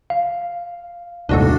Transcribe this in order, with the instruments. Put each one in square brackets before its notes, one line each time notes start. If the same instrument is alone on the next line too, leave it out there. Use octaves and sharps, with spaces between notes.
[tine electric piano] F5
[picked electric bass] D#1 C2 G#2 [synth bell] D4 F#4 A4